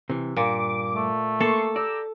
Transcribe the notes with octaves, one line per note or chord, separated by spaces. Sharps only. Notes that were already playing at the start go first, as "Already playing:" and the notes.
C3 E3
G2 A#2 D6
A3
A#3 A4 C6 C#6
G4 D5 A#5 E6